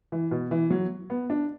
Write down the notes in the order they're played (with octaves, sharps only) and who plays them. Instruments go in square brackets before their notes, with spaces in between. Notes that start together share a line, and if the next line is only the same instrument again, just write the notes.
[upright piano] E3
B2
E3
F#3
B3
D4